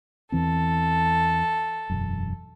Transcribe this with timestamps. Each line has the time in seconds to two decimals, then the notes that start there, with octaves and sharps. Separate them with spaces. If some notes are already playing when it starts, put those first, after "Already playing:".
0.32 E2 E3 C4 A4
1.90 E1 F#2